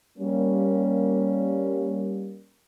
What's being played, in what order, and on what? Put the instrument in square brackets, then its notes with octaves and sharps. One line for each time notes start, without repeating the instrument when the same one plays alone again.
[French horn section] G3 A#3 C#4